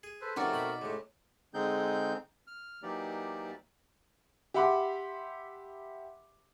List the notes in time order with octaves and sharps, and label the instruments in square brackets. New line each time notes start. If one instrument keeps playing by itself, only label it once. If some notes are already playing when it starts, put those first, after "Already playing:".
[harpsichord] G#4
[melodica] A4 B4 C5
[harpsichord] C#3 F3 [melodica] A3 C4 A#4 [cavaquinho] D#4 F#4 D5
[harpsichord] B2 G5 B5
[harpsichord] A2 C#3 [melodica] G#3 A3 G4
[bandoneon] D3 G#3 C4 D#4 G#4 G6
F6
E3 F#3 A#3 D#4 G4 D5
[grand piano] G4 E5 F#5 B5 C6 D6